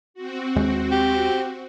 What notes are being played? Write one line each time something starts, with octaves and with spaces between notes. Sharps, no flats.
C4 F#4
D#2 G#3
G4